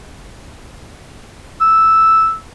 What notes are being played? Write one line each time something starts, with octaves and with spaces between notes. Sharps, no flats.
E6